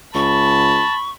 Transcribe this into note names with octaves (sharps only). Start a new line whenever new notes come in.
C#2 A5 B5 C#6